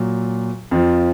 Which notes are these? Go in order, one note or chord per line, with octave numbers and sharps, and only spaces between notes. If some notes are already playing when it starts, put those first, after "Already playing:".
Already playing: A#2 F#3
F2 F3